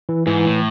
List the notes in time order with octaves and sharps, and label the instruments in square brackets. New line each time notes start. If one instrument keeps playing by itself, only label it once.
[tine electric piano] E3
[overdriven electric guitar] G#2 [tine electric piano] E3
[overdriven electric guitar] A2